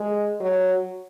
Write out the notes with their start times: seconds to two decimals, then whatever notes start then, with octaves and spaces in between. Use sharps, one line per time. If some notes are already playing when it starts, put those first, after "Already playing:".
Already playing: G#3
0.40 F#3